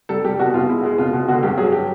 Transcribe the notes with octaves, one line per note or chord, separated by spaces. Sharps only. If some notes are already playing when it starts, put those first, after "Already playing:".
G3 A4
G3 G4
B2 F#4
B2 F4
G#3 E4
G#3
B2 F4
B2
D3 F#4
G2 G4
F#3 G#4
G4